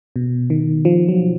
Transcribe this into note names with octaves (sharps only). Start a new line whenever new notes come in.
B2
D#3
F3
F#3